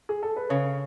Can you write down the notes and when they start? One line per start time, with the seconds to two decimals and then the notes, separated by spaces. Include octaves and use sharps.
0.09 G#4
0.23 A4
0.36 B4
0.49 C#3 C#5